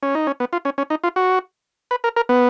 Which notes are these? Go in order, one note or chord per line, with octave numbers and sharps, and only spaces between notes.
C#4
D#4
C#4
B3
F4
C#4
C#4
D#4
F4
F#4
B4
A#4
A#4
B3